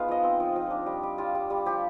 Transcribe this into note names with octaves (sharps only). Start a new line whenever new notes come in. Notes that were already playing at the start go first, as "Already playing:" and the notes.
Already playing: G#3 B3 D#4 F4 B4 F5
F3 D#5
C4
F3
F3
D4
G3
G3
G3 F4
G3
G3
F3 G4